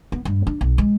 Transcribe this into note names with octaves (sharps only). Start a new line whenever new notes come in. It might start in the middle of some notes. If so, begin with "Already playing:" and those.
B3
G2
D4
B1
G#3